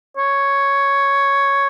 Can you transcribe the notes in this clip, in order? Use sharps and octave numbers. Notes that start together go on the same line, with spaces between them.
C#5